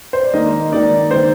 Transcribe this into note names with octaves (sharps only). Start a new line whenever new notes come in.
C5
D5
D#3 A#3 D#4 D#5
D#3 A#3 D#4 D5
D#3 A#3 D#4 C5